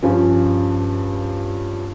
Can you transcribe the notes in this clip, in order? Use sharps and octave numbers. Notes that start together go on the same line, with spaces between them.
G2 F3 C#4